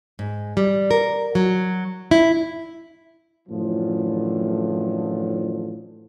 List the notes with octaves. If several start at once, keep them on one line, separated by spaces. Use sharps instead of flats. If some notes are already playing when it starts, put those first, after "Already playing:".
G#2
G3
A#4
F#3
E4
F#2 A2 D3 E3 F3